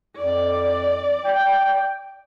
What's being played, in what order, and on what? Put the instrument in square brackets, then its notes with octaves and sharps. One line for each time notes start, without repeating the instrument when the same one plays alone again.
[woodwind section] F2 [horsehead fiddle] D5
[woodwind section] G5